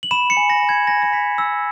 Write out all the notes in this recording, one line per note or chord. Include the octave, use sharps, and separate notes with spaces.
F#7
B5 E7
C#7
G#5
A#6
G#5
G#6
G#5 A#6
A#6
B5 B6
E6